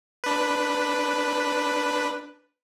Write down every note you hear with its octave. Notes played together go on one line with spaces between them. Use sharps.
D4 B4